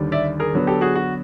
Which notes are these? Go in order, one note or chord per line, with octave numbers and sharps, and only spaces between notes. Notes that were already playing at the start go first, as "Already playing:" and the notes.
Already playing: D#2 D3 G3
D5 E5
G#4 A#4
D3 F#3 B3
G4 A4
F#4 G#4
F#4